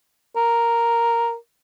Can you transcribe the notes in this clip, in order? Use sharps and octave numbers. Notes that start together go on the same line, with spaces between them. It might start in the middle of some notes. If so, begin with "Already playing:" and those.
A#4